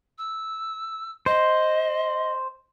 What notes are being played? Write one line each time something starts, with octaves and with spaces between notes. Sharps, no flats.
E6
C5 D#5